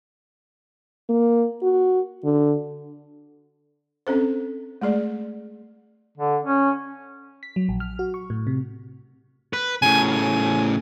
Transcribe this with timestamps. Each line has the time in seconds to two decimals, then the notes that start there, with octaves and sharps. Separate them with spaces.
1.09 A#3
1.63 F#4
2.25 D3
4.07 C4 C#4 A4 C5
4.82 G#3 A3 G#4 D5
6.17 D3
6.43 C#4
7.43 B6
7.56 F#3
7.69 A#1
7.80 F6
7.99 F#4
8.14 C#6
8.30 A2
8.47 C3
9.53 B4
9.82 A2 C#3 G#5
10.12 G#5